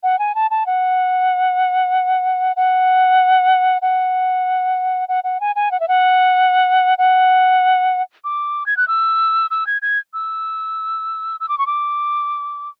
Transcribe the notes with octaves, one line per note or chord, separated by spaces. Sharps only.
F#5
G#5
A5
A5
F#5
F#5
F#5
F#5
F#5
G#5
G#5
F#5
E5
F#5
F#5
D6
G#6
F#6
E6
E6
G#6
G#6
E6
E6
D6
C#6
D6